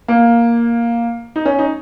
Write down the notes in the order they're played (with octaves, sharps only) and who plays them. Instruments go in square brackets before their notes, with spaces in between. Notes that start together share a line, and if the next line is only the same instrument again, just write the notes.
[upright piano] A#3
D#4
C#4
D#4